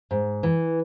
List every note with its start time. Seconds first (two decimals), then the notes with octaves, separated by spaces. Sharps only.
0.11 G#2
0.43 E3